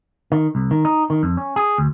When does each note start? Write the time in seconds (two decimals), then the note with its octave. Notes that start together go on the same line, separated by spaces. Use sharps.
0.32 D#3
0.55 C2
0.71 D#3
0.85 D#4
1.10 D#3
1.23 F2
1.37 C#4
1.56 G#4
1.78 D2